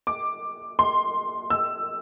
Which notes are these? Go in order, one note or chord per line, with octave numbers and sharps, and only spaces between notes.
D6
C6
E6